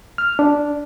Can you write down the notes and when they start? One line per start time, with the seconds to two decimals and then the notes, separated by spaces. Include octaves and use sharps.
0.18 F6
0.39 D4